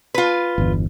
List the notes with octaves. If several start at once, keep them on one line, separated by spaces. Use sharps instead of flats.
F4 B4
G1 E2